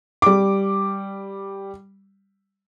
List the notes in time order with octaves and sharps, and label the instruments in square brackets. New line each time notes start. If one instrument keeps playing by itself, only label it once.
[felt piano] G3 D6